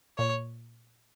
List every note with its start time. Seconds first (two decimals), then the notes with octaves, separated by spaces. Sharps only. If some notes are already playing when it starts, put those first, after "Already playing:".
0.18 A#2 C#5